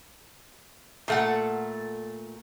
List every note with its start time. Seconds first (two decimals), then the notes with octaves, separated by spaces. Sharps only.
1.08 A#2 A3 F#5